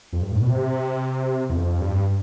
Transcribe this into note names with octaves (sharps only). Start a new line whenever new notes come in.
F2
G2
A2
B2
C3
E2
F2
G2